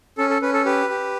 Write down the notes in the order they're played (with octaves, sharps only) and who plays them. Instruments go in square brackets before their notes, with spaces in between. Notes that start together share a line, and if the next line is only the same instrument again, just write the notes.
[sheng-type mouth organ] C#4 A4
A4
C#4 B4
A4
G4 B4
G4